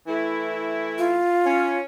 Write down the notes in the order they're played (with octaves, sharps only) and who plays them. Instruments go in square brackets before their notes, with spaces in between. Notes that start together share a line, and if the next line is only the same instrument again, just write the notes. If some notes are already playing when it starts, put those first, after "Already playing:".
[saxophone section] E3 A3 E4
[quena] F4
[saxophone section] C#4